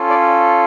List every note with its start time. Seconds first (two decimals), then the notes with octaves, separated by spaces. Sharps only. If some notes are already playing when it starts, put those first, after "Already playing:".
Already playing: C#4 F4 A4
0.10 D5